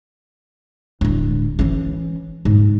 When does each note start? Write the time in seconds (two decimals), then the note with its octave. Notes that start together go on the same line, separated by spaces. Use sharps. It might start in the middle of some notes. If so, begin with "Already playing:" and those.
1.01 D1 G#3
1.59 E3 C#4
2.45 G#2